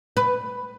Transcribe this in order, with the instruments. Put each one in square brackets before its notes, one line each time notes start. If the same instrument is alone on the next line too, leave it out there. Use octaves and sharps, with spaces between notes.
[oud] B4